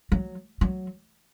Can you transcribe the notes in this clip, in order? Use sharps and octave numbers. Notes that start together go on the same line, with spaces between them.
F#3
F#3